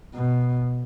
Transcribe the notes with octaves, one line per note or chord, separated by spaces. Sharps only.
B2